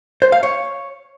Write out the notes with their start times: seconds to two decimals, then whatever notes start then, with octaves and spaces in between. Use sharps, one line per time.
0.22 C5
0.32 F5
0.43 C#5